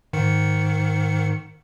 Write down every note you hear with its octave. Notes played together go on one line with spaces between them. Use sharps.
G#2 D#3 C#7